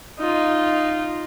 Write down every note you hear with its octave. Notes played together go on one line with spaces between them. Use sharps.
D#4 F4